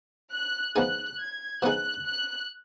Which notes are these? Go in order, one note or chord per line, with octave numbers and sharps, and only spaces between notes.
F#6
F3 B3 D#4 G#4 F#6
G#6
F3 B3 D#4 G#4 F#6
F#6